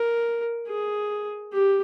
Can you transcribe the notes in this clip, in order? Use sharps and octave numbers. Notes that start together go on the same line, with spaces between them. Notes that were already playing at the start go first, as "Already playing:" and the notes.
Already playing: A#4
G#4
G4